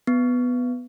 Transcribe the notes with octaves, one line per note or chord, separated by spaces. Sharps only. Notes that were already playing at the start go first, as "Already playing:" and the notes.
B3